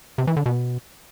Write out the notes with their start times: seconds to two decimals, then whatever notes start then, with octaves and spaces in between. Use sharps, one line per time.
0.18 C3
0.27 E3
0.37 D3
0.46 B2